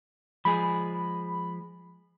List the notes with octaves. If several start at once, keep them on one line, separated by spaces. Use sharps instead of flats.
F3 G#3 G#4 B5